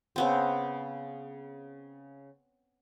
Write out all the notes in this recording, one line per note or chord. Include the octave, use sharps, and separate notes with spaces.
C#3 B3 C4